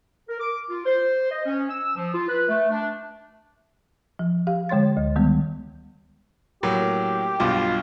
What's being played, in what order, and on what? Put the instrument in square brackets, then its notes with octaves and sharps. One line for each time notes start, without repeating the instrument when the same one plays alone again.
[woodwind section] A#4
D6
F4
C5
D#5
C#4
E6
F3
F4
B4
A3
D4
[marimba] F3
G4 F5
D3 G#3 C#5 C6 A6
D2
D#3 G3 G#3 B3
[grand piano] A2 F#3 A#3 [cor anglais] G4
[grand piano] B1 G2 B2 [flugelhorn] F4